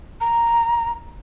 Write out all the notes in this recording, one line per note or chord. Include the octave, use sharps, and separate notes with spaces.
A#5